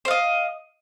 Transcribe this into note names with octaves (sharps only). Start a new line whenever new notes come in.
C5 D#5 F5